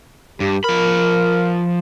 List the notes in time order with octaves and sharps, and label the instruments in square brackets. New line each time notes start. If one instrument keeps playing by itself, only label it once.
[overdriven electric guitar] G2 [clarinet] G4
[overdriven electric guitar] F3 B5 [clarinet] A#4